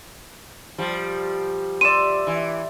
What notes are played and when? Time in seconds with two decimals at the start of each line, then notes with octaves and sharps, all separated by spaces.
0.78 F3 G3
1.81 D5 E5 C6 D#7 E7
2.27 E3